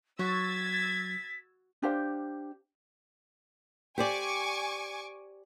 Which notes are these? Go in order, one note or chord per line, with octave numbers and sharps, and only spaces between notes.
F#3 F#4 E6 G#6 A6 B6
D4 G4 C5 F5
G4 C5 D5 G#5 C#6 D6